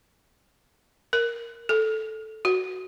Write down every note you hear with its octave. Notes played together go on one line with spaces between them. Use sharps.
A#4
A4
F#4